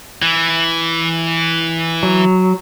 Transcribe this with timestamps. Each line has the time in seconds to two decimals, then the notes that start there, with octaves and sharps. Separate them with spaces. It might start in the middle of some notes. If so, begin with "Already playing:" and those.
0.22 E3
2.03 F#3